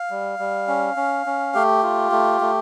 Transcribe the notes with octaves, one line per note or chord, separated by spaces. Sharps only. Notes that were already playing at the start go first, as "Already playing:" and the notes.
Already playing: F5
G3
G3
C#4
C#4
C#4
A3 G4
F4
A3
A3